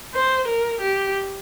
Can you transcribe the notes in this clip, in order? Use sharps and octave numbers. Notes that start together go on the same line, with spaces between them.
C5
A#4
G4